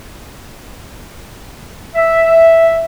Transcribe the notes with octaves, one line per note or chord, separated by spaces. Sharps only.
E5